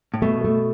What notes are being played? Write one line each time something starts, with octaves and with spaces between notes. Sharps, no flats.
A2
B2 A3
A3